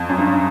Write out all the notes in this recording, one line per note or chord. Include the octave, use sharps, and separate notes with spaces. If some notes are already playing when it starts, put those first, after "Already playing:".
Already playing: F2
F#2
G2